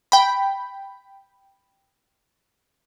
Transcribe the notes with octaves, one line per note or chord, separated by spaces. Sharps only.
G5 B5